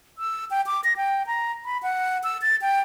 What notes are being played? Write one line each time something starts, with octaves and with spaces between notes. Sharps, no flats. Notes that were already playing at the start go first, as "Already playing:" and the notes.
E6
G5
D6
A#6
G5
A#5
B5
F#5
E6
A6
G5